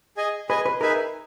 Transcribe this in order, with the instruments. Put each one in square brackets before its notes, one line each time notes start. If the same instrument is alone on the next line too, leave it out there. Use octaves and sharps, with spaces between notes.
[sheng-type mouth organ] G#4 D#5 G#5
[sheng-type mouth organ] G#4 D#5 G#5 [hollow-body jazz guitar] B4
[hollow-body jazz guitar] B4
[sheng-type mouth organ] D#4 G#4 B4 E5 G#5 [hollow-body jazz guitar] A#4